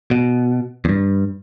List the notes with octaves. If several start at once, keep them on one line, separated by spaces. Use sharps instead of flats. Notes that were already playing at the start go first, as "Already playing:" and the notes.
B2
E2 G2